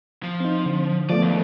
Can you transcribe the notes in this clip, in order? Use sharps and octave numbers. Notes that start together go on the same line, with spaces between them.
F3
C4 D#4
D3
F3 A3 B3 D5
D#2